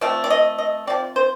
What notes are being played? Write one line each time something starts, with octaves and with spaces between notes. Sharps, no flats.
F3 A3 C4 D5
D5
D#5
D#5
F3 C4 D5
C5